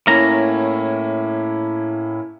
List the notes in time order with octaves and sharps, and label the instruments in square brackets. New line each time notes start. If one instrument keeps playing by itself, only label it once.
[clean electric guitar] A2 A#5 [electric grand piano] A#3 C#4 E4